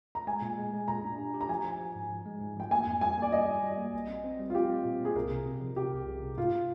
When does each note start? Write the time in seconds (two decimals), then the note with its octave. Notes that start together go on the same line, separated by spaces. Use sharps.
0.15 A#5
0.27 G#3 G#5
0.42 A#2
0.58 G#3
0.73 G#3
0.88 A#2 A#5
1.04 D4
1.18 G4
1.34 G4
1.41 A#5
1.49 F3 G#5
1.64 F3
1.79 F3
1.95 G#2
2.11 F3
2.26 G#3
2.40 G#2
2.56 F3 G5
2.71 A#3 G#5
2.87 F2
3.01 G3 G#5
3.17 A#3 D5
3.32 G3 D#5
3.48 G3
3.63 G3
3.78 A#3
3.93 A#1
4.08 C4
4.24 C4
4.39 G3
4.50 F4
4.54 C4 G4
4.70 C4
4.85 A#2
5.01 A#2 G#4
5.15 C2 A#4
5.30 C3
5.46 C3
5.61 F3
5.76 C3 G4
5.92 C2
6.07 C2
6.22 C3
6.37 G#2 F4